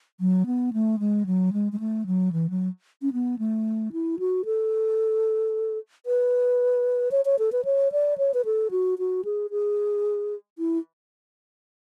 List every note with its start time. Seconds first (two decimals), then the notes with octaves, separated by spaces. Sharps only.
0.20 F#3
0.46 B3
0.73 A3
0.99 G#3
1.26 F#3
1.53 G#3
1.72 G#3
1.80 A3
2.06 F#3
2.32 E3
2.50 F#3
3.02 C#4
3.13 B3
3.39 A3
3.92 E4
4.19 F#4
4.45 A4
6.06 B4
7.11 C#5
7.25 C#5
7.39 A4
7.52 B4
7.65 C#5
7.92 D5
8.18 C#5
8.34 B4
8.45 A4
8.71 F#4
8.99 F#4
9.25 G#4
9.51 G#4
10.58 E4